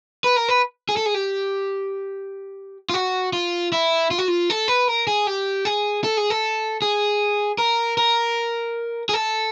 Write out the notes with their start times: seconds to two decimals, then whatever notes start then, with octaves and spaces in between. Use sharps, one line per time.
0.24 B4
0.36 A#4
0.49 B4
0.89 G#4
0.97 A4
1.06 G#4
1.14 G4
2.89 F4
2.94 F#4
3.33 F4
3.72 E4
4.11 F4
4.19 F#4
4.28 F4
4.50 A4
4.68 B4
4.88 A#4
5.07 G#4
5.27 G4
5.65 G#4
6.04 A4
6.17 G#4
6.30 A4
6.82 G#4
7.58 A#4
7.98 A#4
9.09 G#4
9.14 A4